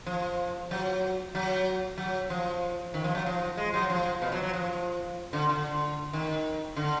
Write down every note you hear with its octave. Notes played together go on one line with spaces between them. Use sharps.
F3
F#3
F#3
F#3
F3
D#3
F3
F#3
F3
G#3
F#3
F3
B2
F#3
F#3
F3
D3
D3
D#3
D3